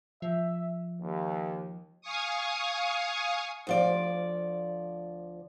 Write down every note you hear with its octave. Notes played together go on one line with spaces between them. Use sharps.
F3 E5
D#2
F5 G#5 C#6 D#6
D2 F3 D5